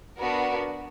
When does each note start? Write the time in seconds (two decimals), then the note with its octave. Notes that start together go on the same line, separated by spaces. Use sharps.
0.19 B3 D4 F#4 A#4